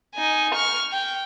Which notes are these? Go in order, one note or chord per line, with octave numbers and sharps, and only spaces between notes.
D#4 G#5
C#6 F6
G5